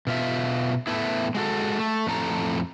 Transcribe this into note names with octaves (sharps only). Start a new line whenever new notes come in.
B2 F4 E5
A2 A3 B3 E4
G#3 F#4 A4
A3
F2 A2 A4 A#5